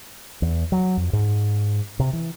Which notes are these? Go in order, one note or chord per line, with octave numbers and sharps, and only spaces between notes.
E2
F#3
F2
G#2
C3
E3